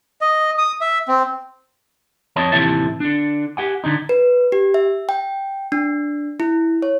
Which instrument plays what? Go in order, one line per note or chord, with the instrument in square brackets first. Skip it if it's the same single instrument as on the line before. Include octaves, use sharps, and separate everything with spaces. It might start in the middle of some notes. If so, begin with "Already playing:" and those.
[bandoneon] D#5
D#6
E5
C4
[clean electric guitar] F2 C#5 D#5 A5
D#2 A2 C3 E3 E5 A5
D3 D4
G4 F#5 G#5
D3 D4 D#4
[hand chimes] B4
G4
E5
G5
D4
E4
C#5